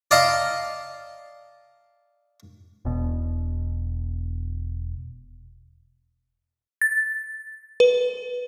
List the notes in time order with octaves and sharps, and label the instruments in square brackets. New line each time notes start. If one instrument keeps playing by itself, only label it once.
[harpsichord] D5 D#5 F5 A5 A#5 C6
[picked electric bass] E1 B2
[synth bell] A6
B4